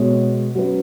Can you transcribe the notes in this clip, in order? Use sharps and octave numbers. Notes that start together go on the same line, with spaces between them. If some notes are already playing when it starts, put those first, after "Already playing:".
Already playing: B2 G#3 B3 F#4 C#5
F#3 C#4 B4